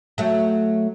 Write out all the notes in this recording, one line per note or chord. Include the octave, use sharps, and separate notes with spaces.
F#3 A3